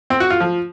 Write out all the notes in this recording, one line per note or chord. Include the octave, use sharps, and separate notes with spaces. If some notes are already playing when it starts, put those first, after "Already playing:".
C4
F#4
F4
F3